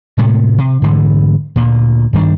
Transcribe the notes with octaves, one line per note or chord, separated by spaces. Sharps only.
A2 C3 G#3 A3
C3
G#2 D3 E3 A3
D2 A#2
G2 D#3 G3 D4